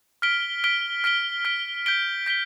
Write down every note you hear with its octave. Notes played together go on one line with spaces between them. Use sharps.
F6 B6 D7 G7
F6 B6 D7 G7
F6 B6 D7 G7
F6 B6 D7 G7
G6 B6 D7 G7
G6 B6 D7 G7